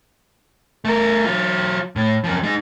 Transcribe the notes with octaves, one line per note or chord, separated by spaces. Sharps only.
A3 A#4
F#3 F4
A2
F#2 F3
G#3 D#4